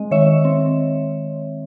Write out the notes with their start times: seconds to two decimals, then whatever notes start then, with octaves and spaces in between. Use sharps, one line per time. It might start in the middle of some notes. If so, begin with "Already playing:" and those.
Already playing: G#3 C4 D#5
0.11 D#3 C#5 E5
0.45 C4